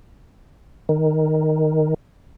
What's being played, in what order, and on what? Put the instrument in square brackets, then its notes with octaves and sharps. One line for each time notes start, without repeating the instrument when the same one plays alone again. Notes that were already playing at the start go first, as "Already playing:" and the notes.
[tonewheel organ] D#3